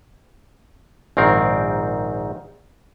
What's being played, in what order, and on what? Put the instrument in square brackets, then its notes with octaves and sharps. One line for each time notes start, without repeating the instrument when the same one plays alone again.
[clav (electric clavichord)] A#1 G#2 D#3 C4 A#4